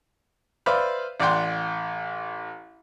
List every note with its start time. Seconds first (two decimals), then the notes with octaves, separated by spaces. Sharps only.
0.66 B4 C5 D5 E5 F5 B5
1.20 A1 D5 F#5 G5 C6